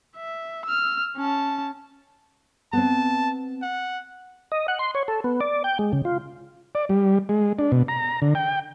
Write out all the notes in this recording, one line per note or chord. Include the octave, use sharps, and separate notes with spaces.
E5
E6 F6
C#4 A5
B3 C4 A5
F#5
D#5
F#5
C6
C#5
A4
B3
D5
G5
G#3
C#3
F4
D5
G3
G#3
D4
B2
A#5
D3
G5